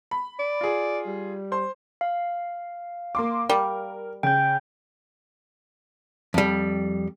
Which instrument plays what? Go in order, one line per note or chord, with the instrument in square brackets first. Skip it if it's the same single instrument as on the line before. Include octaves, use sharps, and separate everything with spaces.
[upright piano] B5
[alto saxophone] D5
[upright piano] F4 G#4
[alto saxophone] G3
[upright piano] C5 C6
[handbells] F5
[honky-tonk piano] A#3 C6 D6
[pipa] G3 [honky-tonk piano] A#4
[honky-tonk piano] C#3 [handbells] G5 G6
[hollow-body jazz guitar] F2 G3